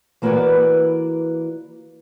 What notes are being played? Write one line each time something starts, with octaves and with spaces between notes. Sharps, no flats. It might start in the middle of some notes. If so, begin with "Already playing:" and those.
E3 A#3 E4 F#4 B4 D5